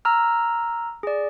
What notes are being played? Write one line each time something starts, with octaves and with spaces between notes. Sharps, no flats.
A#5 E6 F6
G#4 D5